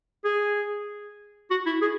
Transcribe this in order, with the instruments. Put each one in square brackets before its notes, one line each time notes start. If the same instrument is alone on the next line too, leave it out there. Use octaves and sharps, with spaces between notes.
[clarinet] G#4
F#4
E4
G#4